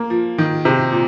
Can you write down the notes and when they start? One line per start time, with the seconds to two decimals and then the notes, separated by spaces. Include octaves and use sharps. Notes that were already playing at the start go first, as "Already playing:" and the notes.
Already playing: A#3
0.10 F3
0.38 D#3
0.65 C3
0.92 A#2